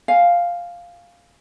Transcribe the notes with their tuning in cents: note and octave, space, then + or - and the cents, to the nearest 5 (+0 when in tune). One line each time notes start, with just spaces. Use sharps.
F5 +0 G#5 +0